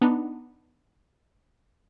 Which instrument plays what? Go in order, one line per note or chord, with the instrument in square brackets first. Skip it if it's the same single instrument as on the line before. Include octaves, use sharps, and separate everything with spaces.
[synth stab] B3 D4 D#4